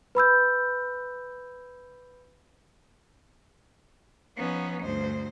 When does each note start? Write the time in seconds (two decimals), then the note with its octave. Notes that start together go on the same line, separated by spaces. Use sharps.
0.15 B4 B5 E6 G6
4.34 F3 B3 C#4 D#4
4.80 D2 G2 C5